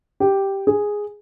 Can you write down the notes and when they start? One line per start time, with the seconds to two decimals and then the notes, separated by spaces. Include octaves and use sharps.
0.20 G4
0.67 G#4